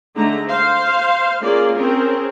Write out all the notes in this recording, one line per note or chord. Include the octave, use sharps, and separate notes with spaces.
D3 G#3 A3 D#4 A#5
C5 F5
A#3 C#4 F4 G#4 D5
C4 C#4 G#4 A#4